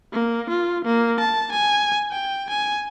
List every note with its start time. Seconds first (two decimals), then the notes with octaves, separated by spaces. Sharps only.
0.13 A#3
0.49 F4
0.84 A#3
1.19 A5
1.52 G#5
2.12 G5
2.50 G#5